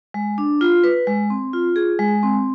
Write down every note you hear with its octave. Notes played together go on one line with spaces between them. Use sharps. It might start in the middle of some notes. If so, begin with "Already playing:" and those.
G#3
D4
F4
B4
G#3
C4
F4
G#4
G#3
C4